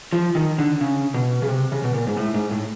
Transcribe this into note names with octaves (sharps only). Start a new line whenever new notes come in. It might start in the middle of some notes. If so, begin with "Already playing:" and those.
F3
D#3
D3
C#3
B2
C#3
C3
C#3
B2
A#2
G#2
A2
G#2
A2